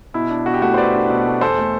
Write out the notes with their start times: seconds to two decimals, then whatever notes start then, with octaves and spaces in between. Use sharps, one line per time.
0.14 B2 E4
0.30 D4
0.46 B2 F#4
0.54 G4
0.61 A3 F#4
0.74 C5
0.77 B2 B4 D5
0.94 D4
1.10 B2
1.26 A3
1.41 E2 A4 C5
1.59 A3